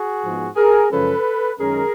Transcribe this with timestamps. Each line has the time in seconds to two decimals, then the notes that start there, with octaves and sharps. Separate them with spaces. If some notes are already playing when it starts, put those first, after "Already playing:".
Already playing: F#4 G#4
0.23 G#2 F3 G#3 B3
0.56 G#4 A#4
0.90 F#2 C#3 F3 G#3 C#4 A4 B4
1.58 F#2 D#3 G#3 C#4 G#4 A#4